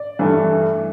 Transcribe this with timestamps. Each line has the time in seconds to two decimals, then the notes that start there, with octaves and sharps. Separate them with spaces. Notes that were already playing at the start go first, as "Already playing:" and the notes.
Already playing: D5
0.19 G2 E3 A3